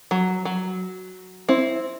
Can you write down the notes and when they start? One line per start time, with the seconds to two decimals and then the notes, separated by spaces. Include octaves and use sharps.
0.11 F#3
0.45 F#3
1.49 C4 E4